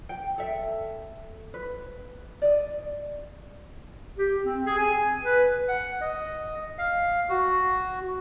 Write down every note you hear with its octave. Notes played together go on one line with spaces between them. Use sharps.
G5
A4 E5
B4
D5 D#5
G4
C4
G#4
G#5
B4
F#5
D#5
F5
F#4